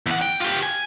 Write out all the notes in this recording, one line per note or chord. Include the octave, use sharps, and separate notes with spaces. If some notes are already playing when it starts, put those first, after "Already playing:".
E2 F#5
G5
F4 G4
G#5